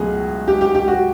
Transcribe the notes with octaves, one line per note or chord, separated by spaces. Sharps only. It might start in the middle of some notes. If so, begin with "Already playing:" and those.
Already playing: C#2 B2 F#3 A3 F#4 G#4
G4
G4
G4
F#4